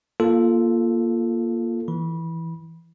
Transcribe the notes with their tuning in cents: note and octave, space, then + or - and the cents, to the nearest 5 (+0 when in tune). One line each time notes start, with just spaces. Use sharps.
A#3 +15 F4 -10 A4 +0
E3 +0 B5 -20